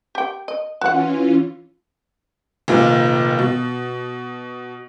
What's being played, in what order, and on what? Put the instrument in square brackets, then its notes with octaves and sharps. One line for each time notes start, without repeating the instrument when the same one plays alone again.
[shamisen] G4 G5
D#5
[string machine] E3 C#4 F4 [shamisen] F#4 F#5
[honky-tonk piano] F1 A#2 D#3 F3 F4
B2